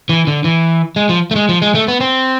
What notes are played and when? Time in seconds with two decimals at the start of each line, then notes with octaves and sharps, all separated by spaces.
0.09 E3
0.27 D3
0.44 E3
0.96 G#3
1.09 F3
1.31 A3
1.36 G#3
1.49 F3
1.62 G#3
1.75 A3
1.88 B3
2.01 C4